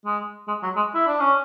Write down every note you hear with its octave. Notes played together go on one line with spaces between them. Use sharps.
G#3
G#3
F#3
G#3
E4
D4
C#4